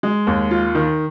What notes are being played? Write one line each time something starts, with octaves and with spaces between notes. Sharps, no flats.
G#3
D#2
F4
D#3